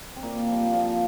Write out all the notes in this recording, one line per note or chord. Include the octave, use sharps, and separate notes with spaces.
C4
A#2 A#3
F3 G3
A#3
F3